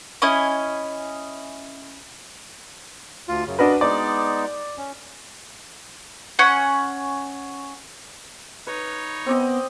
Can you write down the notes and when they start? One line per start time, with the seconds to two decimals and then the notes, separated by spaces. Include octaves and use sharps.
0.22 C#4 E4 D#5 G#5
3.28 D2 F4
3.47 F#2 C#3
3.59 D4 F#4 A#4 B4 D#5
3.81 G#3 B3 D#4 D5
4.78 C#4
6.39 C#4 F#5
8.67 D#4 B4 C#5
9.26 B3 C4 D5 D#5